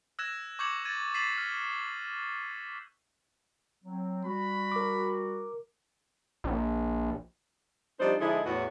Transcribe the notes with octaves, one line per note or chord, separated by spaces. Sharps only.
E6 F#6 G#6 A#6 E7
C#6 D6 G6 G#6 C#7 F#7
G#6 A6 D#7
A6 B6 C7 D#7 E7 F#7
F6
F#3 C4
G3 F#4 B5
A#4 D6
A#1
F3 G3 D4 D#4 C5 D5
D3 F3 G#3 D#4 E4
E2 A2 F#4